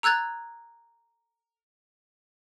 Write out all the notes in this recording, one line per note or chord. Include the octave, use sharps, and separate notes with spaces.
A#5 E6 F#6 G#6 A6